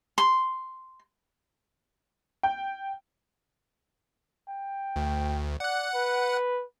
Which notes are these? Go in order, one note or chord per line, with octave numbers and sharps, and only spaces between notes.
C6
G5
G5
D2
D5 F#5 F#6
B4